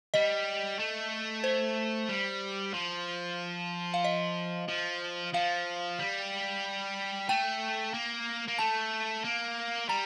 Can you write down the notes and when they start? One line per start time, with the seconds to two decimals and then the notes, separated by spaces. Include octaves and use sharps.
0.14 G3 D#5
0.79 A3
1.44 C5
2.09 G3
2.74 F3
3.94 F5
4.04 D#5
4.68 F3
5.33 F3 F5
5.99 G3
7.29 A3 G5
7.93 A#3
8.48 A#3
8.59 A3 A5
9.25 A#3
9.89 G3 A#5